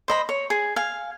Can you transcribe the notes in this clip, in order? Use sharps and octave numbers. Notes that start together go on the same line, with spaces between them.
C5 D#5 B5
C#5
G#4
F5 G#5